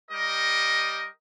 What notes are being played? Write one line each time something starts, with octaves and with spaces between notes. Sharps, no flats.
G3 G4 A#4 D#5